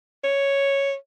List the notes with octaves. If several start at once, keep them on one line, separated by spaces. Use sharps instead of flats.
C#5